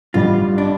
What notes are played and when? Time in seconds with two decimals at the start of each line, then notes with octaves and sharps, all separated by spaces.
0.14 A1 G2 G3 F4
0.58 D4